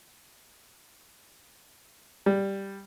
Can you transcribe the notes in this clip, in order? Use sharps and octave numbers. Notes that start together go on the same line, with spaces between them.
G3